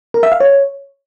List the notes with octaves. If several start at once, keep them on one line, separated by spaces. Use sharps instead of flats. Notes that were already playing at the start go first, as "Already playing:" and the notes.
A#4
E5
F5
C#5